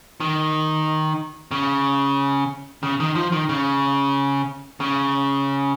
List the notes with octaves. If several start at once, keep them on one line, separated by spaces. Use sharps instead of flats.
D#3
C#3
C#3
D#3
F3
D#3
C#3
C#3